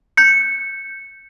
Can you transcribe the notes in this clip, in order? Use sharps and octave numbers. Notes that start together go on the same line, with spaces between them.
G6 C#7